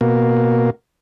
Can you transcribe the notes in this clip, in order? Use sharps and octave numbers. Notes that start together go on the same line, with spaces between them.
B2 A#3